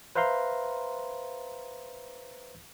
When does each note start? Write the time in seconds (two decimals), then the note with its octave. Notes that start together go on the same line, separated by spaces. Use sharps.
0.16 B4 C5 E5 F5 A#5 C6